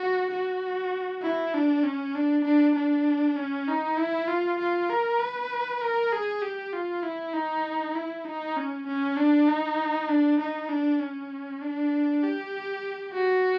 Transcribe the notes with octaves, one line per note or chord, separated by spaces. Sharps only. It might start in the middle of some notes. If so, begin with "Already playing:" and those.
Already playing: F#4
F#4
E4
D4
C#4
D4
D4
D4
C#4
D#4
E4
F4
F4
A#4
B4
A#4
G#4
G4
F4
E4
D#4
E4
D#4
C#4
C#4
D4
D#4
D4
D#4
D4
C#4
D4
G4
F#4